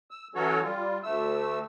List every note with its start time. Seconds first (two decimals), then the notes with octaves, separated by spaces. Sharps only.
0.11 E6
0.35 E3 F#3 C#4 F#4 A4 C#5
0.63 G3 F4
1.03 D2 A3 E6